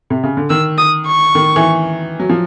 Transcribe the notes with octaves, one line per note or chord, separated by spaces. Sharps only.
C3
C#3
D3
D#3 E6
D#6
C#6
D#3
E3
F#3
F3